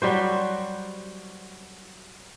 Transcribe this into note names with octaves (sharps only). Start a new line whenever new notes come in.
F#3 G3 F#4 C5